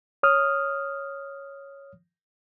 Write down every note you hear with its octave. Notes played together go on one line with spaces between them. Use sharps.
C#5 D#6 F6